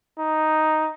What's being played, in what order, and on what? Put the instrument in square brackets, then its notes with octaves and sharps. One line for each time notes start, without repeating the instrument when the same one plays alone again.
[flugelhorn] D#4